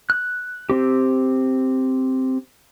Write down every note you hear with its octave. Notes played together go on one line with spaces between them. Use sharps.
F#6
C4 G4